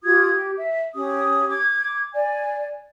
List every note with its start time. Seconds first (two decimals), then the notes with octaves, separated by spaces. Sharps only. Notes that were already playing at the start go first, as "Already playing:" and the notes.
0.03 F4 G4 D#6 G#6
0.30 G4
0.56 E5
0.94 C#4 G4 D#6
1.49 D6 G#6
2.14 D5 G#5